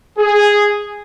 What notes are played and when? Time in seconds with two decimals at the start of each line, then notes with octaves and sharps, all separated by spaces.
0.18 G#4